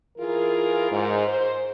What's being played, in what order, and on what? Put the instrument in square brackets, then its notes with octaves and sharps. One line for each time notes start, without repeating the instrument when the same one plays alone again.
[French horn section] E3 F4 G#4 A#4
G#2
C5